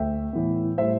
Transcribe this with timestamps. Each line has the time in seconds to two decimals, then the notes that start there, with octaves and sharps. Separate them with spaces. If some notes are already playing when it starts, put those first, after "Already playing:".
Already playing: D2 E5 G5
0.33 A2 E3 B3
0.78 A2 G3 C5 E5